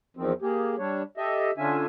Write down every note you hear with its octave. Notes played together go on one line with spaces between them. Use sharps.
E2 D#3 F3 C4
A#3 G4 G#4
G3 D4 C#5
G4 A4 D#5 E5
D3 C#4 D4 F4 E5 G#5